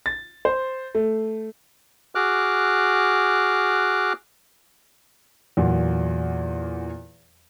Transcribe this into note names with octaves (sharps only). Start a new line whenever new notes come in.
A6
C5
A3
F#4 G#4 D6 F6 F#6
E2 A#2 F#3